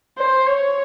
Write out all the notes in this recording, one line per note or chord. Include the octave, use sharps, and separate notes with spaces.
C5
C#5